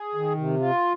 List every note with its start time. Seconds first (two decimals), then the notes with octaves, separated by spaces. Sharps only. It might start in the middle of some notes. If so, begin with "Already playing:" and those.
Already playing: G#4
0.15 D#3
0.37 C3
0.60 F4